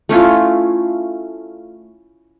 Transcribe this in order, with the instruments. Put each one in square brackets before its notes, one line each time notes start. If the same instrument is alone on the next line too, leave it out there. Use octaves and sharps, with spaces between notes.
[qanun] A3 C#4 E4 F4